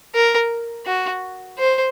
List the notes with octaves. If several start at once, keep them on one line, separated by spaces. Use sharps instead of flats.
A#4
F#4
C5